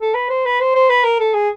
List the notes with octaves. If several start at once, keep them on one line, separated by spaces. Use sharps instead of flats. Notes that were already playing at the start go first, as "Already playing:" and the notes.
A4
B4
C5
B4
C5
C5
B4
A#4
A4
G#4